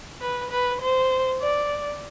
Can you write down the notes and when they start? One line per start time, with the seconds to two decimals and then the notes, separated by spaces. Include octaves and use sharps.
0.21 B4
0.50 B4
0.80 C5
1.42 D5